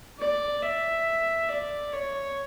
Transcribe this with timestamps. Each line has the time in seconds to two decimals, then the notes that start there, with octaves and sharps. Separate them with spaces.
0.19 D5
0.62 E5
1.49 D5
1.93 C#5